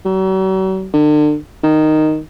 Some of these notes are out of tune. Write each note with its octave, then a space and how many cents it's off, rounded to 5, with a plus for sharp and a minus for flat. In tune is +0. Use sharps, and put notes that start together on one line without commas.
F#3 +45
D3 +40
D#3 -5